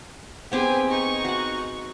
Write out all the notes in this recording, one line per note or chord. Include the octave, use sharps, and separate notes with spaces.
B3 C4 G4 G#4 G#5
D#4 C#6
F#4 F#5